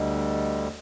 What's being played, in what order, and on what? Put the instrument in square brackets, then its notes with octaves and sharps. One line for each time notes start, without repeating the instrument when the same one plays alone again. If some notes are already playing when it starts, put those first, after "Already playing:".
Already playing: [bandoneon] D2 D3 G3 [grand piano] D#5